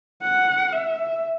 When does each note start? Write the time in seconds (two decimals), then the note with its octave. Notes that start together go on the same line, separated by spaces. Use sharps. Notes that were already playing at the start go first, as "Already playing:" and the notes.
0.22 F#5
0.72 E5